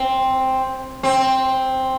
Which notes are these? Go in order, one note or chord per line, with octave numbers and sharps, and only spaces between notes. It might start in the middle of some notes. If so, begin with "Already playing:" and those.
Already playing: C4
C4